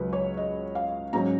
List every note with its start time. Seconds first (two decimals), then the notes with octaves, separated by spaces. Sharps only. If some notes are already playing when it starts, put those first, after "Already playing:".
Already playing: C#2 C#3 F#3 B4
0.13 C#5
0.37 D#5
0.75 F5
1.13 G#2 F#3 C#4 A#5